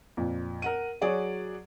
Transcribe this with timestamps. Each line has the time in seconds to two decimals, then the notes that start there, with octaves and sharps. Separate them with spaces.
0.17 F2 A#2
0.62 A#4 F#5 D#7
1.01 F#3 F#4 G#4 C#5 D5 F#5